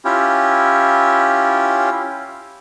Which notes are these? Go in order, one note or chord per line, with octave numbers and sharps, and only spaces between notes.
C#4 E4 F4 G4